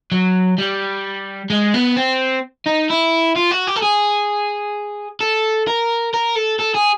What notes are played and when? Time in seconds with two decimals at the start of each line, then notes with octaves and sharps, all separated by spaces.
0.12 F#3
0.58 G3
1.50 G#3
1.74 B3
1.96 C4
2.66 D#4
2.90 E4
3.36 F4
3.51 F#4
3.67 G4
3.76 A4
3.82 G#4
5.20 A4
5.67 A#4
6.14 A#4
6.36 A4
6.60 A4
6.75 G#4